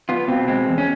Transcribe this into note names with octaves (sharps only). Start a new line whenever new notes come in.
B3 F4
B2 C4
G#3 C4
E2
C#4